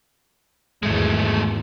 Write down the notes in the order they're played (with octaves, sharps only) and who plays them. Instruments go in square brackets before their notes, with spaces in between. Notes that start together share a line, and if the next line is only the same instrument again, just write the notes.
[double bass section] G#1 E2 [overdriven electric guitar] G#3 A3